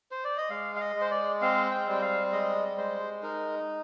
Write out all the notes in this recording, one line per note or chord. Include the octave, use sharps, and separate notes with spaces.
C5
D5
D#5
G#3 F5
F5
D#5
G#3
C5
D5
C4 F5
G5
G3 G5
F5
G#3 D#5
G#3 C5
D#4 A#4